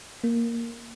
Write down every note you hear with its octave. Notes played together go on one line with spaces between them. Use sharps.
A#3